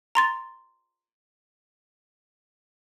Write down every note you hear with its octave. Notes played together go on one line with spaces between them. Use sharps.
A#5 C6 A6